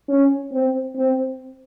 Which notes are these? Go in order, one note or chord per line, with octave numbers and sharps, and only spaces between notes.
C#4
C4
C4